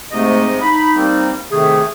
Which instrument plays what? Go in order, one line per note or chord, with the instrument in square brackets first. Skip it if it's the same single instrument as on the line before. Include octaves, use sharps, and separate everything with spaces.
[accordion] G#2 C3 D#5 [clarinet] A3
[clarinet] D#4 [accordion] B5
[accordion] G3 A#3 C4
[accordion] C3 D#3 A3 [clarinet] G#4